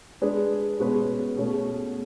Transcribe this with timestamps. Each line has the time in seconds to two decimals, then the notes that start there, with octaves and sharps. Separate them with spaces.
0.22 G#3 D4 G#4 B4
0.80 B2 G#3 C#4 G#4 B4
1.37 B2 A3 C#4 G#4